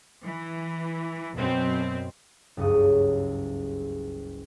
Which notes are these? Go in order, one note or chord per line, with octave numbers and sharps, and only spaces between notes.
E3
F#2 B2 C4
F#1 C#2 G2 D#6